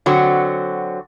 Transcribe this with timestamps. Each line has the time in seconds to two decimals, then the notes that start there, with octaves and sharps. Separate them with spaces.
0.06 D3 F#3 C4 F#4